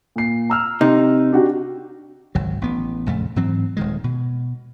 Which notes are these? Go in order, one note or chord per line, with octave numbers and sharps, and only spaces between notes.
A#2 C7
A#5 E6 F6
C3 D#4
D4 F#4 G4
G#1 C#2 F#3
A1 B3
A#1 F2 C#3 A3
G#2 E3 F#3 C4
D#1 D#3 G#3
B2